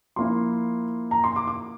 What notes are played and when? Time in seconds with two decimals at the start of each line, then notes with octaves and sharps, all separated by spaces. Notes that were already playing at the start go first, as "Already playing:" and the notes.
0.16 F3 A#3 E4 C6
1.11 A#5
1.24 C6
1.36 D6
1.47 D6